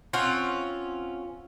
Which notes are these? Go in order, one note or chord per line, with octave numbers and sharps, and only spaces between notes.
C4 C#4 F4 F#5